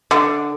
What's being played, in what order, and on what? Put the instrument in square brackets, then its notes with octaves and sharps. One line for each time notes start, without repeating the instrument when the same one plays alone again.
[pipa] D3